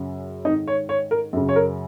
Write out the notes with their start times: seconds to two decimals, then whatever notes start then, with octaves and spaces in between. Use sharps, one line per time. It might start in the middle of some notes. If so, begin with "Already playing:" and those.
Already playing: F#2 C#3
0.45 G#2 D#3 D#4
0.68 C#5
0.89 C#5
1.11 A#4
1.33 F#2 C#3
1.49 C#5
1.56 A#4